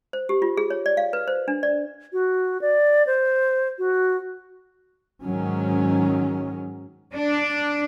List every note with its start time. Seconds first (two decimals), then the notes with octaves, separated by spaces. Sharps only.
0.13 C5
0.29 G4
0.42 F4
0.57 G#4
0.70 C#5
0.86 D5
0.97 F5
1.13 B4
1.28 C5
1.48 D4
1.63 D5
2.13 F#4
2.61 D5
3.07 C5
3.79 F#4
5.23 G#2 D#3 F#3 C#4
7.15 D4